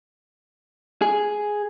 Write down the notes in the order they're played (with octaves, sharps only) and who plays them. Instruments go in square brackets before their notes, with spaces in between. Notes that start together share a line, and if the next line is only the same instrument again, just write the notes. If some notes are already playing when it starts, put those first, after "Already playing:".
[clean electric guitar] G#4